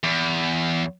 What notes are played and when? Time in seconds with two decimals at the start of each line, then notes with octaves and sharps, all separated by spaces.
0.03 E2